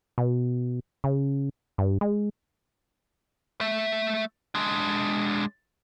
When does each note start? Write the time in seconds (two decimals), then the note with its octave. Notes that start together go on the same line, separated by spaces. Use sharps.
0.18 B2
1.04 C#3
1.78 G2
2.01 G#3
3.61 A3 E5
4.55 G#3 D4